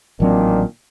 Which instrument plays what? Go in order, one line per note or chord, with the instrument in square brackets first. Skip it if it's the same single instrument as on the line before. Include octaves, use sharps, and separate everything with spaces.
[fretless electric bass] A1 F#3 C4 [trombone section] A#2 D#3 D4